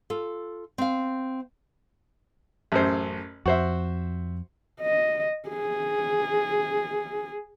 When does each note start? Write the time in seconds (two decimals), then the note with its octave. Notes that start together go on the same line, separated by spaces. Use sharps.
0.10 F4 A4
0.78 C4 F5
2.72 A1 F#2 C5
3.46 F2 F#4 C5 E5
4.81 D#5
5.49 G#4